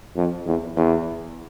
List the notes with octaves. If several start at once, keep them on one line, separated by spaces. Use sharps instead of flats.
F2
E2
E2